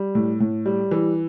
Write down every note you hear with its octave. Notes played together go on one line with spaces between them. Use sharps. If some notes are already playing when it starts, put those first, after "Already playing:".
Already playing: G3
A2
A2
G3
E3